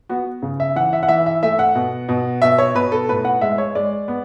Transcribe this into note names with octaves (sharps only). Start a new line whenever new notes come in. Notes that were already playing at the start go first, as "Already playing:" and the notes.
B3 F#4
C#3
E5
E3 F#5
E5
F#5
E3 E5
E5
A3 E5
F#5
B2
B2
B2 E5
C#5
B2 B4
A4
A2 B4
F#5
G#3 E5
C#5
G#3 D5
B3